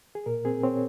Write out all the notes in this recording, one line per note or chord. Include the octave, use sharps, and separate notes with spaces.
G#4
A#2 A#4
C4 G#4
C4 C#5